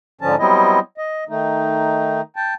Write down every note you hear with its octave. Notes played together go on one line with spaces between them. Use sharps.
G#2 D3 F3 C#4 A5
F#3 G3 B3 C4 E4 D#5
D#5
D#3 A3 D#4
G5 A5